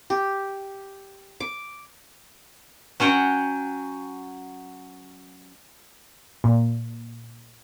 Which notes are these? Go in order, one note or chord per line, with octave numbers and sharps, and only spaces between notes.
G4
D6
F#3 C#4 F#5 G5
A#2